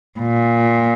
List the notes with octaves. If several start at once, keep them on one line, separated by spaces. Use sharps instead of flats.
A#2